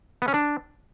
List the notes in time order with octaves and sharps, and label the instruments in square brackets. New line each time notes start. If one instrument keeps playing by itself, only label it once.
[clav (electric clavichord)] B3
C#4
D4